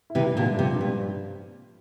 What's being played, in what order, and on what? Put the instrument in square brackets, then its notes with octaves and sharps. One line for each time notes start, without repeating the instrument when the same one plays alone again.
[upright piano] E4
[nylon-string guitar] C3 E3
[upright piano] G2
[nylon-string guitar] A#2 D3
[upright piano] G2
[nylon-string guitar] C3 [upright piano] F3
[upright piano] G2
[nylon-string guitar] A#2